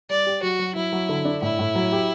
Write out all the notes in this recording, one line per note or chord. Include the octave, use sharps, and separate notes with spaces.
G3 D5
G4
F#3 F#4
F#3
F#3 E4
F#3
D3
D4
A2 E4
A2
F#3
G4